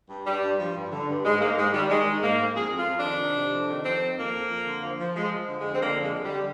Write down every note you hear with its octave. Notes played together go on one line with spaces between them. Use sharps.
G2
G2 G3
G2
F3
G2
D3
G2
G#2 G#3
G#2 A#3
G#2 G#3
D#3 G3
D#3 G#3
D#3
G#2 A#3
G#2
F2 G#4
F2
F4
F2
D#3 D4
C3
C3
F2
D#3
F2 C4
F3
F2 A#3
F2
F2
D3
F3
F3
F3 G#3
F3
D3
G#3
F2
C4
D3 A#3
F2
G#3
D3
G3
D3